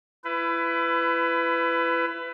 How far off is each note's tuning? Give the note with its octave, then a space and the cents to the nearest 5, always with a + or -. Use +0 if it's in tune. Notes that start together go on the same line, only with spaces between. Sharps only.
E4 +30 B4 +20